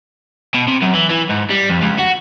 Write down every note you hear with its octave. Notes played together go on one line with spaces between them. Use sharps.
B2
C3
F#2
E3
E3
G#2
G3
F2
C#2
F#4